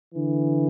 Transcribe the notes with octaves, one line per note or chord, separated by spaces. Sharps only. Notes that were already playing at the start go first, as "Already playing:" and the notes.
D3 E3